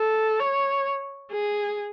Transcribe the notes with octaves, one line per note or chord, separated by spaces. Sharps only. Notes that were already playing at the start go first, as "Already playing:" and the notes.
Already playing: A4
C#5
G#4